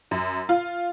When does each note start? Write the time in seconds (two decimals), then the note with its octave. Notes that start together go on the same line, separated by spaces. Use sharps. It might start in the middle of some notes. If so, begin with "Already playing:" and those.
0.11 F#2
0.49 F4